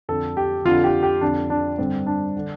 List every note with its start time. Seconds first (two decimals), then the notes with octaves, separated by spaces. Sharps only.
0.08 F2 D3 A4
0.37 G4
0.65 F2 D3 F4
0.84 G4
1.03 G4
1.21 F2 D3 D4
1.50 D4
1.78 G2 D3 C4
2.06 D4
2.37 D3